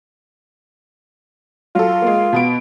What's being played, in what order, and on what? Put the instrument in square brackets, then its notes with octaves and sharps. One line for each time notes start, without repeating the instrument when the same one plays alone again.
[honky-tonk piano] F#3 A4 [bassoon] F4
[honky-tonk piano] G#3 A#3
B2 B3 D7